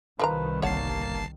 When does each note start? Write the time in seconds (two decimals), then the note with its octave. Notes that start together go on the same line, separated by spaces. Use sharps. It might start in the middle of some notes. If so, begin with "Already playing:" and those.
0.19 C2 D#3 F3 A#4 B4 A#5
0.62 G1 A#3 C#5 F#5 A5 C7